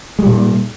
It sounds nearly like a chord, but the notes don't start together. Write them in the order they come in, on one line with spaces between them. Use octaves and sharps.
G#3 G3 A#2